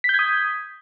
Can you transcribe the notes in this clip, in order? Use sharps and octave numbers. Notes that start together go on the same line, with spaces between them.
D#6 G6 G#6 B6